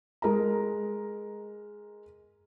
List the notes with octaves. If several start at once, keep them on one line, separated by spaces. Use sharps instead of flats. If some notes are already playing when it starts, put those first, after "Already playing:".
G#3 A#4 D#5 A#5